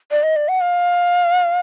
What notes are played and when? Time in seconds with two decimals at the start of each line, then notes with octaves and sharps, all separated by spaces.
0.12 D5
0.23 D#5
0.36 D5
0.48 F#5
0.61 F5